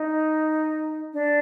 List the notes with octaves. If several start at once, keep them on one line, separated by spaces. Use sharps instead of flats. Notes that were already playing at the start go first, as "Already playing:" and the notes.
Already playing: D#4
D4